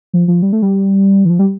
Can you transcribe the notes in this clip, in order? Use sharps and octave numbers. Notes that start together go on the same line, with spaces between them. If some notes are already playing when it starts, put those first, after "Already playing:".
F3
F3
G3
A3
G3
E3
F3
G3